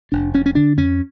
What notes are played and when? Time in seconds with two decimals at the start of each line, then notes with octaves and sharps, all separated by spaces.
0.12 F1 D4
0.34 F1 C#4
0.46 C#4
0.55 D3 D4
0.77 F2 C#4